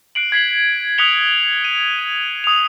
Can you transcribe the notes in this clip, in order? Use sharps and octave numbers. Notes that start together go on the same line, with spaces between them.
F#6 C7 D7 F#7
G#6 B6 C7 F#7
D#6 F#6 B6 C#7 F7 G7
D#7
D#7
D#6 F7